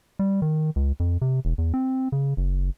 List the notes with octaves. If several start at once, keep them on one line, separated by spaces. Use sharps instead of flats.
G3
D#3
C#2
F2
C3
E1
E2
C4
C#3
F#1